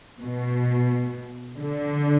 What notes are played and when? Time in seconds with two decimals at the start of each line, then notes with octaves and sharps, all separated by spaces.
0.21 B2
1.58 D3